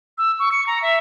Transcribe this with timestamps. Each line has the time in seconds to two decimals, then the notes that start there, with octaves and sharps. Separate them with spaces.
0.18 E6
0.39 C#6
0.52 C#7
0.67 A#5
0.82 E5